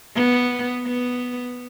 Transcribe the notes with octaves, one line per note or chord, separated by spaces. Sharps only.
B3
B3